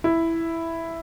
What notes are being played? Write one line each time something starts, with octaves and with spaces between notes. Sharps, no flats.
E4